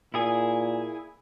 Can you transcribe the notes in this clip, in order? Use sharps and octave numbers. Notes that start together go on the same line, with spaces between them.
A#2 E4 G#4 G#5